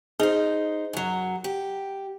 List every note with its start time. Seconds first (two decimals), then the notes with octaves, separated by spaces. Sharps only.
0.20 D#4 G#4 C5
0.93 F#2 F#3
1.44 G4